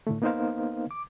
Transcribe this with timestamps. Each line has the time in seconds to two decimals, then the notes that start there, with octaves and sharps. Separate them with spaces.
0.07 A2 D3 A3
0.22 A#3 B3 D#4 A#4 C5 F5
0.91 D6